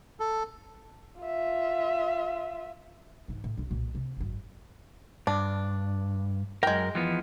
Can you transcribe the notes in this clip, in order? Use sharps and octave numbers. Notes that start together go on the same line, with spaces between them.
A4
F4 E5
G#2 E3
A2
B1 F#2
B1 A#2
C3
G#1 F#2
G2 D4
F#2 G#3 A#4 G5
E3 F3 B3